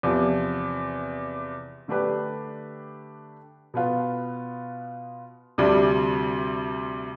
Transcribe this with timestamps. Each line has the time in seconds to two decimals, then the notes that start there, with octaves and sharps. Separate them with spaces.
0.03 E2 C3 F3
1.88 D3 A3 D4 G4 B4
3.74 B2 B3 F4
5.58 D2 C3 G3 D4